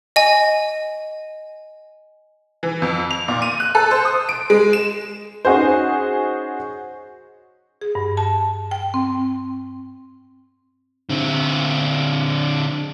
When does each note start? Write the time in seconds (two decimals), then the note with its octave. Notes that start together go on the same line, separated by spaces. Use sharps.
0.16 D#5 G#5
2.63 E3
2.82 F2
3.11 F7
3.28 A#2
3.42 D#7
3.60 F#6
3.75 A4
3.91 C5
4.05 D#6
4.29 D7
4.50 G#3
4.73 E7
5.45 C#4 D#4 F#4 G#4 C5
7.81 G#4
7.95 G2
8.17 A5
8.71 G5
8.94 C4
11.09 D3 C4